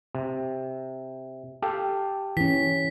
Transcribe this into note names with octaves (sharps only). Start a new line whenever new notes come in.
C3
G4 A4 F5
E3 C#4 B6